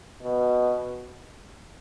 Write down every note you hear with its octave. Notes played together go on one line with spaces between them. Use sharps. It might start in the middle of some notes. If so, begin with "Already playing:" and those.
B2